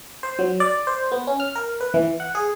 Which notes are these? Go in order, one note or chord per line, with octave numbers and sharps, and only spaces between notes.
C5
F#3
D5
C5
B3
C#4
F6
A#4
B4
E3
F#5
G#4